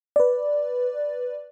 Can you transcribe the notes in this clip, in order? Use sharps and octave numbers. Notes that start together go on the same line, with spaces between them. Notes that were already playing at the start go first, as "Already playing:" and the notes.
B4 D5